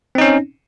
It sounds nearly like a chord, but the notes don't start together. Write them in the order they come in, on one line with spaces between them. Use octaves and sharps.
C4 D#4 C#4